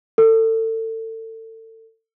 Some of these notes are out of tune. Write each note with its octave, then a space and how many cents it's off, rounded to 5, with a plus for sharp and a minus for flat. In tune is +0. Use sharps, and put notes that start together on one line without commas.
A4 +30